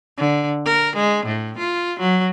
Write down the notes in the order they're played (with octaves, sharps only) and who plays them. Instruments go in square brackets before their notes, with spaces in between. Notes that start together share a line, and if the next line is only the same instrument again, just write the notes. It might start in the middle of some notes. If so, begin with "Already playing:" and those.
[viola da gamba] D3
A#4
G#3
A2
F4
F#3